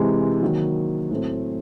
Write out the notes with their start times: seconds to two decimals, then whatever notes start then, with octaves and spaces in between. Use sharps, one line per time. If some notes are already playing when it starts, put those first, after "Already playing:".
Already playing: C3 E3 G#3
0.42 D#3 F#3 A#3
1.11 A2 F#3 A3 C4